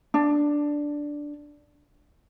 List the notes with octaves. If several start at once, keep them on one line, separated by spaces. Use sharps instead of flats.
D4